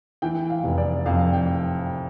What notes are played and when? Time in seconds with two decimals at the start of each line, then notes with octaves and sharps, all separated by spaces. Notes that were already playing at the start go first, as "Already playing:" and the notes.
0.22 E3 G5
0.50 F5
0.64 F1
0.78 D5
1.06 F2 F5
1.33 G5